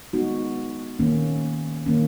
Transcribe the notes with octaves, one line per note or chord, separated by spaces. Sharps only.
G#3 B3 D#4 F#4
D#3 A#3 C#4
D#3 A#3 C#4